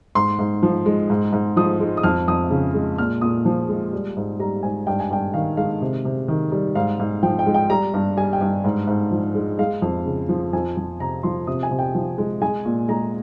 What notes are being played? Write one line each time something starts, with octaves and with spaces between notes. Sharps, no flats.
G#2 C6
G#2
F3
G#3
G#2
G#2
F3 D#6
G#3
D#6
F2 F6
F2 D#6
C#3
G#3
A#2 F6
A#2 D#6
F3
G#3
G3
G#2
G3 A#5
G#2 G#5
G2 G5
G#5
G2 G5
D#3 F5
G#3 F5
C3
C3
D#3
G3
G#2 F5
G#2
F3 G5
G5
G#3
G5
G3 A#5
G2
G3 G#5
G5
G2
G#2
G#2
F3
G#3
G#3 F5
F2
C#3
F3
F2 G#5
F2
C3 A#5
F3 C6
C3 D#6
G#5
C3
G5
F3
G#3
G#3 G#5
A#2
G#3 A#5